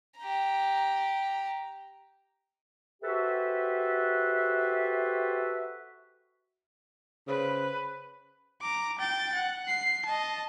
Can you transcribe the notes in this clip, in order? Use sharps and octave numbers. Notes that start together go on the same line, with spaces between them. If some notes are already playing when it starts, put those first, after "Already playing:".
G4 A#5
F#4 G4 A4 B4 C5 E5
C#3 B4 C5
A#5 D6
G5 A6
F#5
C7
D#5 A5